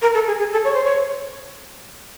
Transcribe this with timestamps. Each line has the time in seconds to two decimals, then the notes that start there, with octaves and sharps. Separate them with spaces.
0.02 A#4
0.14 A4
0.27 G#4
0.39 G#4
0.52 A4
0.64 C#5
0.74 C5
0.84 C#5